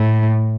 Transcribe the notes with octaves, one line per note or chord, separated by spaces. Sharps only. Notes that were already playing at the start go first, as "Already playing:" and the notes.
Already playing: A2